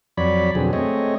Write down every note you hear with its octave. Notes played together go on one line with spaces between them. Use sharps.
F2 F#3 C#5 D5 B5
F2 B2 D3 F#3 C4 G#4
G#3 A3 C4 C#5 D#5